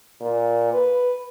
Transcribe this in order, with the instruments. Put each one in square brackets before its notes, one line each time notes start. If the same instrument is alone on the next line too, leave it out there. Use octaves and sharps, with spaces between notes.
[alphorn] A#2
B4